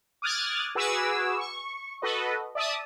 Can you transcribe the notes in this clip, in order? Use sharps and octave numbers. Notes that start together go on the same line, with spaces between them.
D6 D#6 F6 F#6 G#6 A6
F#4 G#4 B4 G#5 D6 E6
C#6
F#4 A4 B4 D#5
D5 E5 A5 D#6